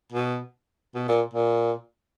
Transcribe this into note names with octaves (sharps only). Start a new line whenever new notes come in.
B2
B2
A#2
A#2